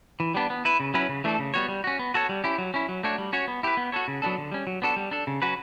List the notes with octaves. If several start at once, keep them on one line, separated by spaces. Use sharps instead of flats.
E3
G3 B3 D4
B3
E4 B4
C#3
F#3 C#4 E4 B4
C#3
E3 A3 D4 A4
C#3
G3 B3 F#4 C#5
G3
C#4 F#4
B3
F#4 A4 C#5
G3
C#4 E4 G4
F#3
C#4 E4
F#3
A3 D4 F#4 C#5
G3
C#4 F#4 C#5
B3
E4 G4 B4
B3
F#4 A4 C#5
C#3
F#3 B3 D4 A4
D3
G3 C#4
F#3
B3 D4 F#4 A4
G3
D4 A4
C#3
F#3 C#4 F#4 B4